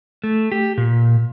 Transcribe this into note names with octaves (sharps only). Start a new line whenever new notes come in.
A3
G4
A#2